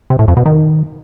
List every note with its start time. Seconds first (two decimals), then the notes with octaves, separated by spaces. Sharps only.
0.10 C3
0.19 A2
0.28 F2
0.37 B2
0.46 D#3